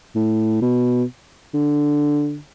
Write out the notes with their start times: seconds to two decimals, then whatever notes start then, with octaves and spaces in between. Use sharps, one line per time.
0.15 A2
0.62 B2
1.54 D3